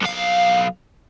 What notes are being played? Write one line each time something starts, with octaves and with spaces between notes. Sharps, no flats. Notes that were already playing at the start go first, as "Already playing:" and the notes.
B1 F5